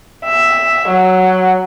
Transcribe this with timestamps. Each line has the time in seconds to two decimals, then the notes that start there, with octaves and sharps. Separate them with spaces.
0.25 E5
0.88 F#3